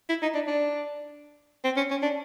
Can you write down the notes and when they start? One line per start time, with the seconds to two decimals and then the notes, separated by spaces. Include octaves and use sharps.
0.09 E4
0.22 D#4
0.35 D4
0.47 D4
1.65 C4
1.77 C#4
1.90 C#4
2.03 D4